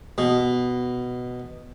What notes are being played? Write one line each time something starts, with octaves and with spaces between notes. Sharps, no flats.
B2